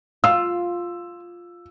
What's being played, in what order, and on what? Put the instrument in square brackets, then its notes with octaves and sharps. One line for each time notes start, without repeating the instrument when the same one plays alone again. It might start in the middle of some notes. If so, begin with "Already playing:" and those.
[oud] F4 [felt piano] E6